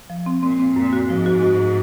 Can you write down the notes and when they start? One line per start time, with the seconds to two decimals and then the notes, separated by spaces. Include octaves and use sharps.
0.10 F3
0.26 C4
0.43 A#2 C4
0.60 C4
0.76 F#2 A#2
0.93 F#4
1.09 G#2 F3
1.26 F#4
1.43 F#4